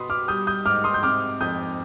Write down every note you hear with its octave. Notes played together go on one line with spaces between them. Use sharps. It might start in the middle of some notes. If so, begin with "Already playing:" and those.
Already playing: B2 B3 B5 C6 D#6
D6 F6
G3 D#6 G6
D#6 G6
G#2 D6 F6
C6 D#6
G6
C3 D6 F6
F2 D#6 G6